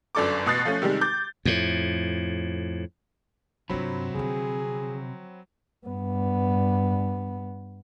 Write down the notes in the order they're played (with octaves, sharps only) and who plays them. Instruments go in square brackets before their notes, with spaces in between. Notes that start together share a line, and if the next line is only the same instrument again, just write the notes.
[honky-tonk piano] G1 F#2 D4 A4 C#6 D6
A1 B2 D#6 F#6 A6 C7
F3 A3 C#4
C3 D#3 G3 G#3
D6 G6 A6
[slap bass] F2 A2
[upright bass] G2 F4 [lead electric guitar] C3 [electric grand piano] F#3 C4 B5
[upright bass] D3 F3 [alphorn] G#4
[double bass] G2 B3